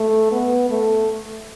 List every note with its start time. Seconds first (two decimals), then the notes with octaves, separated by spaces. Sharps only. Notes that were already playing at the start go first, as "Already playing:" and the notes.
Already playing: A3
0.32 B3
0.70 A3